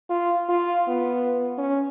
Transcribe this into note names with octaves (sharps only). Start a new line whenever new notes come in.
F4
F4
B3
C#4